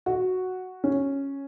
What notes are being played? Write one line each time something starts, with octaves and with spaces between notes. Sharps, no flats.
F#4
C#4